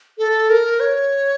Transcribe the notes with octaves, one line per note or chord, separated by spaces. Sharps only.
A4
A#4
C#5